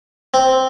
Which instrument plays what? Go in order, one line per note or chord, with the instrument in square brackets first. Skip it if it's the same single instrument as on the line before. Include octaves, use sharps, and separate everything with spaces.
[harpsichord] C4